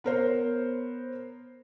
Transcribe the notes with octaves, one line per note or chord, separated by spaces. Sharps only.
B3 A#4 C5 C#5